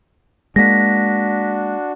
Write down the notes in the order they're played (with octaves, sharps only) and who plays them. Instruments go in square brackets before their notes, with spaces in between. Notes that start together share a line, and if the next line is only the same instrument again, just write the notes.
[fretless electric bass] G#3 A#3 [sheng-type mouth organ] D4 F#4 [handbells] A#6 B6